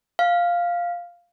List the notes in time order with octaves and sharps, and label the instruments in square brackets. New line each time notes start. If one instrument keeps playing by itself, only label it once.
[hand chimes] F5